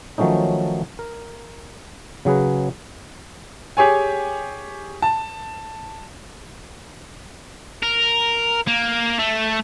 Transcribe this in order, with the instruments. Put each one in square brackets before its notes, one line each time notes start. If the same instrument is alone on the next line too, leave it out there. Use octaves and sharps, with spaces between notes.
[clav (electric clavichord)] D#3 F3 F#3 A3 C#4 D#4
A#4
C#3 F#3 G#4 B4
[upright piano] G4 G#4 C#5 G#5
A5
[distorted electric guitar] A#4
A#3
A3